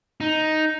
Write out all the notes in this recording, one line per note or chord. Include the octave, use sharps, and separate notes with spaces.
D#4